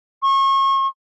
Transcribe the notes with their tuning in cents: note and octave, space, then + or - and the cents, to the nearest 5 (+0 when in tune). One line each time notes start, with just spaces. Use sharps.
C#6 -35